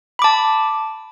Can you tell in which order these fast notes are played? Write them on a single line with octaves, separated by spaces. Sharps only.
B5 D6 A5